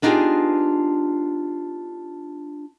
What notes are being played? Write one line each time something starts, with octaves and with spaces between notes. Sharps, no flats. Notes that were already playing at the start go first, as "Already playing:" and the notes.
B3 D4 D#4 F4 G4 G#4